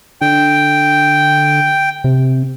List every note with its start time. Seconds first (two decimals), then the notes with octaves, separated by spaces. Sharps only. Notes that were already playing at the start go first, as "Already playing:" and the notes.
0.21 D3 G5
2.04 C3